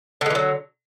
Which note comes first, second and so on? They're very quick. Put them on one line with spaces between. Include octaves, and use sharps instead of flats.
D3 G#3 E3 F#3